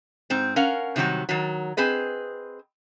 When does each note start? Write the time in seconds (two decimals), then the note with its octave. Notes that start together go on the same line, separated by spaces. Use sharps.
0.30 G#2 C4
0.56 C#4 A#4 F5 F#5
0.96 C3 D#3 F#3 G3 F#4
1.29 D#3 F#3
1.77 C4 G#4 B4 D#5